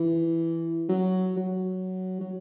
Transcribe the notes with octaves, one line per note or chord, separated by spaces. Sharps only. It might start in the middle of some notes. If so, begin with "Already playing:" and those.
Already playing: E3
F#3
F#3
F#3